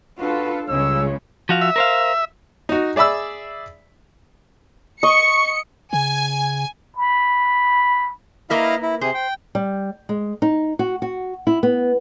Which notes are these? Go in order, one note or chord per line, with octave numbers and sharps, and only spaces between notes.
D4 F4 F#4 A4 B4
C#2 C#3 G3 G#3 C#5 E6
F3 F#4 F5
E5
A#4 C5 F5
D#4 F#4
G#4 D5 E5 B5 E6
D#5 C#6 C#7
C#3 G#5
B5
A#3 E4 A#4 B4 D#5 F5
E4
C3 G#4 C5
G5
G3
G#3
D#4
F#4
F#4
E4
B3